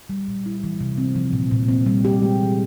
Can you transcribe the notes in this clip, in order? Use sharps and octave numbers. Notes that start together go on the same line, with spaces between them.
G3
A#2
E4
E3
C3
C4
F3
A#2
A#2
C4
G3
G4
G#3
E3